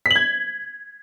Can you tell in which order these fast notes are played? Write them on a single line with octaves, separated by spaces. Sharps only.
B6 F#7 G#6